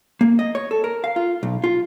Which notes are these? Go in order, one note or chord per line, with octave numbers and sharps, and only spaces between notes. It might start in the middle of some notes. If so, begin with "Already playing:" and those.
A#3
D#5
C#5
A4
A#4
F5
F4
B1
F4